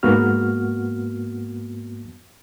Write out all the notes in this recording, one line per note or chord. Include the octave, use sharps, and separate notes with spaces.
G#2 A#3 B3 F#4 F6